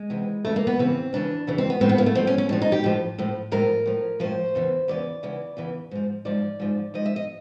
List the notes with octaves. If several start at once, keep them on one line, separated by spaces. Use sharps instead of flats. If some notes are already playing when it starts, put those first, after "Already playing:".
Already playing: G#3
E2 C3 E3
F2 C#3 E3 A3
A#3
B3
F2 C#3 E3 C4
F2 C#3 E3 D4
F2 C#3 E3
C4
B3
A2 F3 C4
B3
A#3
A3
A2 F3 C4
C#4
C#4
A2 F3 D4
D#4
G4
A2 F3
A2 F3
A2 F3 A#4
A2 F3
A2 F3 C5
E2 C#3 E3
E2 C#3 E3 D5
E2 C#3 E3
E2 C#3 E3
G#2 F3
G#2 F3 D5
G#2 F3
G#2 F3 D#5
E5
D#5